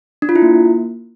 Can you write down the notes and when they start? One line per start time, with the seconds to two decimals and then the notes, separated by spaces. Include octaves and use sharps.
0.22 D4
0.29 F4
0.36 E4
0.42 A#3